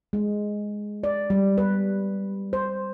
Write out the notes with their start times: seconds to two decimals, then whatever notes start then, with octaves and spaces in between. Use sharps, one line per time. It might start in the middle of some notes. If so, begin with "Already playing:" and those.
0.13 G#3
1.04 D5
1.30 G3
1.58 B4
2.53 C5